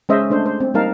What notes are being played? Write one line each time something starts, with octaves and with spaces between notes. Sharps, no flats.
G#3 C#4 C5 D#5 E5
A3 D4 C5
C5
C4
G3 A#3 D#4 A#4 F5 A5